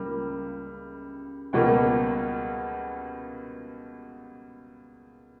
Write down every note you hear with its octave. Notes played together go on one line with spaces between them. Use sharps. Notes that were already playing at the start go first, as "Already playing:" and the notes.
Already playing: C#2 C#3 G3 A#3
C#2 B2 G3 A#3